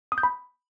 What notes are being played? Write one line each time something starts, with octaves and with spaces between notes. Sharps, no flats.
D#6
G6
B5